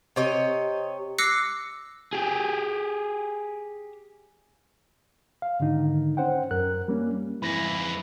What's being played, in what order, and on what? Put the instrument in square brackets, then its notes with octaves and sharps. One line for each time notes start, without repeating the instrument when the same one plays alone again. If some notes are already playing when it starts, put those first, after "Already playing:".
[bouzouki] C3 C#5 D#5
[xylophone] D6 E6 F#6 A#6 C7 C#7
[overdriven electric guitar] G4 G#4
[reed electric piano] F5
G#2 D3 D#3 D#4
C#4 C5 F#5 G5
F#2 A#4 F#6
G3 A#3 C#4
[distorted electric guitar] F2 B4 [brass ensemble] G#2 E3 [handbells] B5 A#6